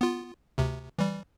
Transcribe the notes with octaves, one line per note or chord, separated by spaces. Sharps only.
B3 F4
D2 C3
E3 G3